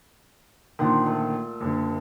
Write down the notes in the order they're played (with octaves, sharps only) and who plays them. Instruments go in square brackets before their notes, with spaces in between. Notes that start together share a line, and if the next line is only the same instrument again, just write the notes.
[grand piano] A#1 D3 D#3 [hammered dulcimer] F#5 C6
[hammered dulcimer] A#2 A3
[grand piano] F#1 D3